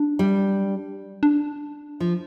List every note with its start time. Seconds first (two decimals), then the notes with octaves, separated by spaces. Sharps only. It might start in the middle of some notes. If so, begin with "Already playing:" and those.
Already playing: D4
0.19 G3
1.23 D4
2.00 F3